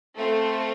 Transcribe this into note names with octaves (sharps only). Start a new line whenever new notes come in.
A3 C4 F4 A4